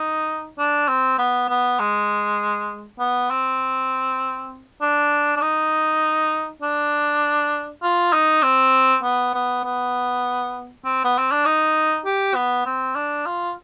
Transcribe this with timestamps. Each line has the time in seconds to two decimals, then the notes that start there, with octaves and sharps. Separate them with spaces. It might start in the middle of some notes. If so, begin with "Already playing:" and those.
Already playing: D#4
0.59 D4
0.88 C4
1.19 B3
1.49 B3
1.79 G#3
3.00 B3
3.30 C4
4.82 D4
5.37 D4
5.42 D#4
6.62 D4
7.83 F4
8.13 D#4
8.43 C4
9.03 B3
9.34 B3
9.64 B3
10.85 C4
11.04 B3
11.18 C4
11.32 D4
11.45 D#4
12.05 G4
12.35 B3
12.66 C4
12.96 D4
13.26 F4